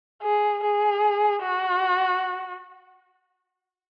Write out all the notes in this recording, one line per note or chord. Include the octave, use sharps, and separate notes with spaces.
G#4
G#4
F#4